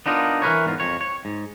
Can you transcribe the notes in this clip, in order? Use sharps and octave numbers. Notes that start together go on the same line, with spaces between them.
B3 D4 D#4 F4 A#4
E3 A#4 B4 C#5
E2 G#2 F4
F2 C#5
C#5
G#2